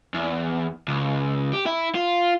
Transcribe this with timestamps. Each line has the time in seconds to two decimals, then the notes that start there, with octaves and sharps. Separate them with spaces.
0.14 E2
0.88 C#2
1.53 G4
1.66 E4
1.95 F4